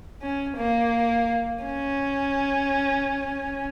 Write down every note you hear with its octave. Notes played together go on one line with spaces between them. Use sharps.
C#4
A#3
C#4